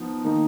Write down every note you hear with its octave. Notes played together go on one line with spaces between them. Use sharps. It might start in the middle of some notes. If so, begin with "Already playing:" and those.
Already playing: F3 B3 D#4
D#3 A#3 D#4